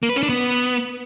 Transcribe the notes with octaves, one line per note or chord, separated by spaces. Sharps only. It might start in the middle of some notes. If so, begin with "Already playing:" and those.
A#3
B4
C#4
D4
B3